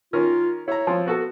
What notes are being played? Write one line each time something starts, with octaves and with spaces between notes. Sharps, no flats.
D#3 C#4 F4 A#4
E4 C#5 A#5
F3 C4
B3 F#4 A4